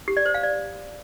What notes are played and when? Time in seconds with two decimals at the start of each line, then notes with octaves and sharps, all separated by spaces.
0.08 G4
0.17 D5
0.26 C5
0.34 F5
0.43 D5